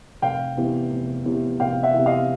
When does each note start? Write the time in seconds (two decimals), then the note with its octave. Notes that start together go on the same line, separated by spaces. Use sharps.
0.22 F1 F5 G5
0.57 E2 C3 E3
0.91 F1
1.25 E2 C3 E3
1.60 F1 F5 G5
1.83 E5 F#5
1.94 E2 C3 E3
2.06 D#5 F5